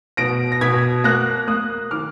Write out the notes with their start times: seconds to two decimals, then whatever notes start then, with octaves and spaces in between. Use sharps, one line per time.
0.17 B2 A#6 D7
0.52 A#6
0.61 B2 G#6 B6
1.04 A#3 F#6 A#6
1.47 A#3 D#6 F#6
1.91 D#3 D6 F6